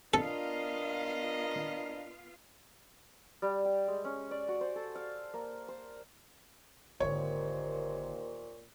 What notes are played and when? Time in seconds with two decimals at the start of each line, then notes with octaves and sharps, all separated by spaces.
0.14 B3 D4 F4 A4 A#4 D#5 F5
3.42 G3
3.65 G5
3.88 G#3
4.05 C#4
4.31 D5
4.48 F#4
4.61 C5
4.76 A4
4.95 F5
5.34 A#3
5.68 C5
7.00 G#1 D#2 A#2 D3 C5 C#5